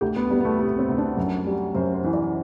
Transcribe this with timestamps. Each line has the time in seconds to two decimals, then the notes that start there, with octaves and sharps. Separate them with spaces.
0.01 D2 G4
0.16 B3
0.30 G3 B3
0.40 B3
0.45 A3
0.59 C3 B3
0.79 C4
0.89 D2
0.98 D4
1.17 F#2
1.46 G3
1.75 F#2 C5
1.94 C5
2.04 E3
2.13 D5